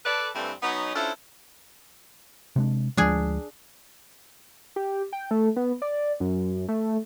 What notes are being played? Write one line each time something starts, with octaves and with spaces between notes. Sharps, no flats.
A4 B4 D5
G2 E3 G3 A3 C4
F#3 B3 C#4 D#4
C#4 D4 E4 F4 A4 C5
C3 G#3 D4
D2 F3 G#3 D4 G#4
G4
G5
A3
B3
D5
F#2
A3